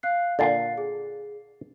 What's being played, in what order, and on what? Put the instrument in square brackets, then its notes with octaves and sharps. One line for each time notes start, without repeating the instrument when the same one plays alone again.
[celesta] F5 F#6 C7
[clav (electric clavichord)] A#2 D3 [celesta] F5 A6 C7
[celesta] G#4